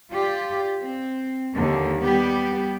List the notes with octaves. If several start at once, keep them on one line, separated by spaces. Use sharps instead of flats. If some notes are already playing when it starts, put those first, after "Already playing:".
F4 G4 D5
C4
D#2 D3
G3 B3 G4